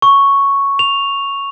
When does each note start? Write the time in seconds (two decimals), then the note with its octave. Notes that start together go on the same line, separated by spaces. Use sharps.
0.02 C#6
0.79 F7